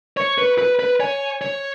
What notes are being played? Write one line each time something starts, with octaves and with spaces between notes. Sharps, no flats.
C#5 C#6
B4
B4
B4
C#5 G#5
C#5